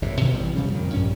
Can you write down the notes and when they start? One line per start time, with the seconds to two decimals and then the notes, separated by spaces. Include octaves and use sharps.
0.02 F#1 E2 C3
0.20 G2 B2 D#3 E3
0.34 A1 E3 G3
0.55 F1 C#3 G3 C#4
0.72 F2 A#2 D#3
0.93 A#1 G2 C#4